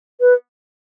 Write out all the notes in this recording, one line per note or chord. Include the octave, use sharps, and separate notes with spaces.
B4